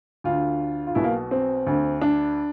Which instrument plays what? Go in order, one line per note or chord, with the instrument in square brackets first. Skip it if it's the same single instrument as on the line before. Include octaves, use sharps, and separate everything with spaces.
[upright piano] D2 D3 F4
F4
B1 B2 E4
A#3
C4
D2 D3
D4